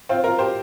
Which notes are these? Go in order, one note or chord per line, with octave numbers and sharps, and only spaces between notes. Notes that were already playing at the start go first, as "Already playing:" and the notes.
C4 F4
F4 A#4
G4 C5